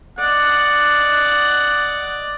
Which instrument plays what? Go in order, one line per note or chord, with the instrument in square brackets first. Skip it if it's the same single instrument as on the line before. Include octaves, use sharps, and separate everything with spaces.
[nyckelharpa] D5 D#5 [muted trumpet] F#5